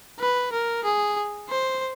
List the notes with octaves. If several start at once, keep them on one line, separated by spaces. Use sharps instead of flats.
B4
A#4
G#4
C5